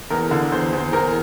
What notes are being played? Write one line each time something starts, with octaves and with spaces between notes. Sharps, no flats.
E2 A#4
D3
E2 C5
E2
C5
E2 A#4